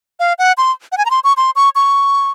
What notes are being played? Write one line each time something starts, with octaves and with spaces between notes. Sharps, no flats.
F5
F#5
C6
F#5
G#5
A#5
C6
C#6
C6
C#6
C#6